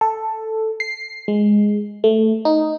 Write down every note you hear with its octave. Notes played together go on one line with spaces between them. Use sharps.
A4
C7
G#3
A3
D#4